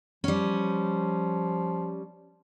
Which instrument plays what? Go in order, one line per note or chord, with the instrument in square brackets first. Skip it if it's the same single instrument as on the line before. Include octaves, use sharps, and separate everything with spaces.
[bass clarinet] F3 [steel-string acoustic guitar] G3 C#4